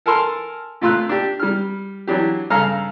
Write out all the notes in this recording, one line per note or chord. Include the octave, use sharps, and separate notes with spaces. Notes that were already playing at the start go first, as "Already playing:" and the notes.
A4 A#4 G#5 A5 C6 F6
A#2 A3 F4 C6 E6 F#6
D4 G4
G3 F6
E3 F#3 D4 G4
G2 C#3 A4 F5 A#5 F6